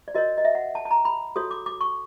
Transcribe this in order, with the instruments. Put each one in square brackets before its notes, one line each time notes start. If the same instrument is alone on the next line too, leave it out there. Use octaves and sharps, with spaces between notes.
[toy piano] D5
F#4 A#4 C#5 D#5
D#5
E5
F#5
A5
A5
A#5
B5
F#4 A4 C#5 D#6
D6
D6
C#6